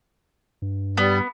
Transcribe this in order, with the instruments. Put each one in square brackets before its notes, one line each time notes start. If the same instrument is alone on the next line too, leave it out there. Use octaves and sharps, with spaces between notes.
[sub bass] G2
[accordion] G3 [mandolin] B3